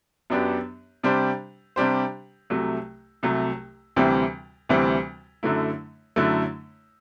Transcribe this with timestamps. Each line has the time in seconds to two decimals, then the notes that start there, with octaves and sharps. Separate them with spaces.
0.30 F#2 F#3 B3 D4 G4
1.03 C3 G3 D4 G4 C5
1.76 C3 G3 D4 G4 C5
2.50 C2 C3 F#3 A3
3.23 C2 C3 F#3 A3
3.96 D2 C3 E3 G3 C4
4.69 D2 C3 E3 G3 C4
5.43 F#2 D3 F#3 A3 E4
6.16 F#2 D3 F#3 A3 E4